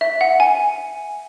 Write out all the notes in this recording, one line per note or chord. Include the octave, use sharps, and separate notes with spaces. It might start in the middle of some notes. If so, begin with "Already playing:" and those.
E5
F#5
G#5